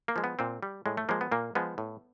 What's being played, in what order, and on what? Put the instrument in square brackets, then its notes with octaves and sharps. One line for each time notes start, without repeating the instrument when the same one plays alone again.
[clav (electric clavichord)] A#3
F3 G#3
B3
A#2 C4
G3
A2 G#3
A3
F3 G#3 A#3
B3
A#2 A#3
F3 G#3 B3
A2